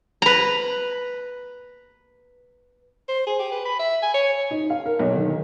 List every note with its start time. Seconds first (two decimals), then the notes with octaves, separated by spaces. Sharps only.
0.22 B4 A#5
3.08 C5
3.26 G#4
3.39 G4
3.52 B4
3.65 B5
3.79 E5
4.02 G#5
4.14 C#5
4.51 D#4
4.70 F5
4.86 A#4
4.99 B1
5.15 D#3
5.30 D#3